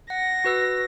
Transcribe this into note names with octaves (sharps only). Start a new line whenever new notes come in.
F#5 A#6
F#4 B4 E6